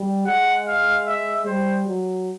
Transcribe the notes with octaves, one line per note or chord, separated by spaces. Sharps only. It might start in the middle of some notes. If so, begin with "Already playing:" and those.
Already playing: G3
G#3 F#5
F5
E5
G3 C5
F#3